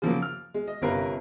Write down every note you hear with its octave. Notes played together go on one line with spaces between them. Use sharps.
C#3 F3 F#3 A#3
F6
G#3
D#5
G1 C3 C#4 A#4 B4 F5